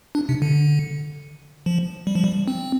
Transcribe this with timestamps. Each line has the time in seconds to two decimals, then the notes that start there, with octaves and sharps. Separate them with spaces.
0.15 D4
0.29 C3
0.42 D3
1.66 F3
2.07 G3
2.15 F3
2.24 G3
2.48 C4